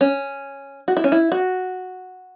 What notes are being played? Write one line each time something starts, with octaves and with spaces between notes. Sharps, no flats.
C#4
F#4
E4
C#4
E4
F#4